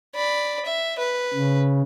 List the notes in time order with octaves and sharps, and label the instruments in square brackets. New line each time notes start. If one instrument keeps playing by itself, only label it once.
[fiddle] D5 B5
E5
B4
[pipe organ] C#3